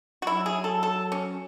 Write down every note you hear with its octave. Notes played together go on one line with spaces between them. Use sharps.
F#4
F#3 E4
G#4
A4
A4
C#4